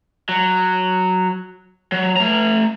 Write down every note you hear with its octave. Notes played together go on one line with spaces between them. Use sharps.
F#3
F#3
A3 A#5